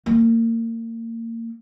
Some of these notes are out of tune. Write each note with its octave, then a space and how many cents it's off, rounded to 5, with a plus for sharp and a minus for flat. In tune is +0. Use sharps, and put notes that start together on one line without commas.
A#3 -30